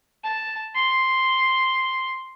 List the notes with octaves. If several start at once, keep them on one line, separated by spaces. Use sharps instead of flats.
A5
C6